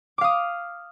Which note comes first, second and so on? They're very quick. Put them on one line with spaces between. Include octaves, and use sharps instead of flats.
D6 F5 D#6